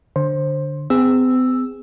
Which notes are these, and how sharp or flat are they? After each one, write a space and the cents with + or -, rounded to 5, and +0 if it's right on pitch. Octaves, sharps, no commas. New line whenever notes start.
D3 +5 C5 +15
C4 -45 G#4 -20 E6 +0